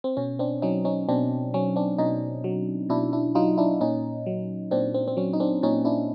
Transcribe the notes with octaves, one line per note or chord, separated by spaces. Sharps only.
C4
B2 C#4
C4 D4
F#3 C#4 D#4
C#4 D#4
B2 C4 D4
F#3 C#4
C4 D4
B2 C#4 D#4
F#3
B2 D4 E4
D4 E4
F#3 D#4 F4
D4 E4
A#2 C#4 D#4
F#3
A#2 C4 D4
C4
C4
F#3 C#4
D#4
C4 D4
A#2 C#4 D#4
D4 E4